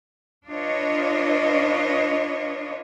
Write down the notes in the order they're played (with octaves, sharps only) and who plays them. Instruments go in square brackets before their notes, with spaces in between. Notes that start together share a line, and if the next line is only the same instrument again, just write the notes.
[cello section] D4 F4 B4 C#5 D#5